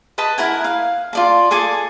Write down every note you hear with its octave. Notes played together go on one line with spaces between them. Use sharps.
B4 D#5 A5 B5
E4 A#4 F#5 G#5
F5
F4 D5 A5
G#4 A4 G#5 D6